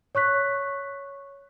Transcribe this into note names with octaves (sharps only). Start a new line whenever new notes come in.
C#5 C#6 F#6 B6